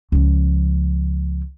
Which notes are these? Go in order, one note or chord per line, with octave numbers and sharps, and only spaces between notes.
C#2 F3